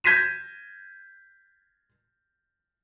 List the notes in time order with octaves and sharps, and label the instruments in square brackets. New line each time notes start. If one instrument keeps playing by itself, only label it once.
[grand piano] G6 G#6 A#6 B6 D#7 E7